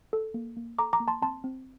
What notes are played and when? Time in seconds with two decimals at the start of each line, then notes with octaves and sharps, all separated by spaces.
0.13 A4
0.34 A#3
0.57 A#3
0.79 A4 A#5 D6
0.93 A#5 D6
1.00 A#3
1.08 A5 C6
1.22 C4 A5 C6
1.44 C4